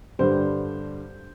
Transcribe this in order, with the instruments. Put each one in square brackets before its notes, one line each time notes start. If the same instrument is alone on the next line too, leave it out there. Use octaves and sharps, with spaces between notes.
[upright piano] G2 D3 G3 C5